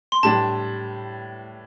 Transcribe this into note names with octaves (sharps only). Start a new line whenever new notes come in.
C6
A2 G3 D4 A5